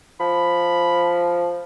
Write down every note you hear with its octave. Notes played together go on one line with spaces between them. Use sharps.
F3 B5